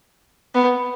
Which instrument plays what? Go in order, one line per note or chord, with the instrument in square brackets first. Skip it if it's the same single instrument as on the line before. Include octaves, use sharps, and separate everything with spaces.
[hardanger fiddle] B3